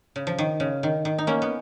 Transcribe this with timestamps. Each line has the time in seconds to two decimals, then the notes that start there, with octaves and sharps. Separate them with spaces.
0.16 C#3
0.27 F3
0.38 D#3
0.60 C#3
0.83 D#3
1.05 D#3
1.18 D#4
1.27 A#3 C#4
1.42 B3